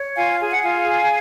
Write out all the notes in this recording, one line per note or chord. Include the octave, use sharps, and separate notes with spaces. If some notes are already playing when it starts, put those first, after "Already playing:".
Already playing: C#5
F4 F5 G#5
G#4 G#5
F#5
F4 F5 G#5
G#4